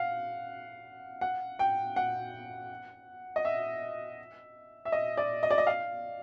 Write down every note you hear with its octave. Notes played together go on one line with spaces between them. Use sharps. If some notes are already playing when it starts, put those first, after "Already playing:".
Already playing: F5 F#5
F#5
G5
F#5
D#5
E5
E5
D#5
D5
D#5
D5
D#5
F5